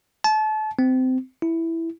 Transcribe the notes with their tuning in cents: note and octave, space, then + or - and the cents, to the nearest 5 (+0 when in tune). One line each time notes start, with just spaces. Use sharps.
A5 -30
C4 -25
E4 +0